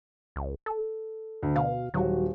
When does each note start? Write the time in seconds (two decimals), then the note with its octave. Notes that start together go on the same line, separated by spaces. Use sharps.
0.36 C#2
0.66 A4
1.42 D2
1.56 B2 F5
1.94 D#1 F#3 F#4